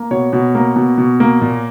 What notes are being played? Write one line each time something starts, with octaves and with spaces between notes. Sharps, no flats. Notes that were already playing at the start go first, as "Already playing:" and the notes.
Already playing: A#3
B2 C#5
B2
A#3
B2
B2
A#3
A#2